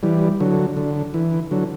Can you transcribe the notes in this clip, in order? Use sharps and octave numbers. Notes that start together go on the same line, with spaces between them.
E3 G3
D3 F#3
D3
E3
D3 F#3